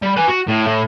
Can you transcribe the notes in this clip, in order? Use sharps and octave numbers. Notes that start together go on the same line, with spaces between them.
G3
B4 G#5
F#4
A2
A2